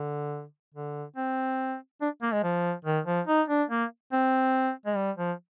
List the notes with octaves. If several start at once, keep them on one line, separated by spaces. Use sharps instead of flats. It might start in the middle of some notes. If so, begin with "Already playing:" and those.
Already playing: D3
D3
C4
D4
A#3
G#3
F3
D#3
F3
D#4
D4
A#3
C4
G#3
G3
F3